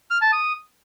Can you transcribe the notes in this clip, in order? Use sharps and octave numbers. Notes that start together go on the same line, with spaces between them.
F6
A5
D#6